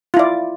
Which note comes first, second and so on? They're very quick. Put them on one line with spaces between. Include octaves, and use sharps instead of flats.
F4 E4 D5